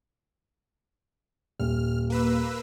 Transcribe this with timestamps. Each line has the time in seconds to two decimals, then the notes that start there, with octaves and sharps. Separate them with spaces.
1.60 D#1 F6
2.10 A#3 B4 E6